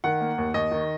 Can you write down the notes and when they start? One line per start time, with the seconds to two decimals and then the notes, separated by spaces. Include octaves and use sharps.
0.04 D#3 F#5
0.21 A#3
0.38 D#2
0.54 D#2 D#5
0.72 D#3